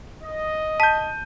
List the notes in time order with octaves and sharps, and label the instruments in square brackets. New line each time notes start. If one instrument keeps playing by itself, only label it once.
[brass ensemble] D#5
[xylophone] A5 B6 [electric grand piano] G6 D#7